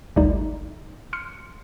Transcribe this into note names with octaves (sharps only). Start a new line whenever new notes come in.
G#1 D2 G3 A3 D#4
C6 F6 C#7